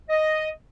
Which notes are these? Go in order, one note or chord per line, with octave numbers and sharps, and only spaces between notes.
D#5